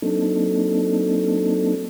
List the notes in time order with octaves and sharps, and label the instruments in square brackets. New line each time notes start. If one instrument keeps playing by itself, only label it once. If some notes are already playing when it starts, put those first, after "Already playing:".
[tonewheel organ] F#3 A#3 C4 D4 D#4 A4